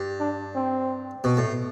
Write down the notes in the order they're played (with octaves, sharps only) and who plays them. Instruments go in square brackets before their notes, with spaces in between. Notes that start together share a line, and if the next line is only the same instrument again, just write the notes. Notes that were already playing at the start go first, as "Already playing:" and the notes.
Already playing: [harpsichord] G2
[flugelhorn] D4
C4
[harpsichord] B2
A2